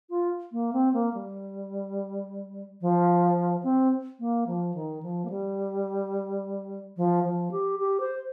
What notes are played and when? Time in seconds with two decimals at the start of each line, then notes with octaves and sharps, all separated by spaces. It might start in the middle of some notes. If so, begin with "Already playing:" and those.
0.10 F4
0.52 A#3
0.73 C4
0.93 A#3
1.14 G3
2.81 F3
3.63 C4
4.19 A#3
4.47 F3
4.74 D#3
5.03 F3
5.25 A#3
5.30 G3
6.97 F3
7.24 F3
7.51 G4
7.79 G4
8.00 C5